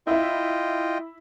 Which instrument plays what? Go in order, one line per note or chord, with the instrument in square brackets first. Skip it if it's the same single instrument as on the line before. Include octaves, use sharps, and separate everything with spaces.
[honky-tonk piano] E4 E5 [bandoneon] F4 D#5 G5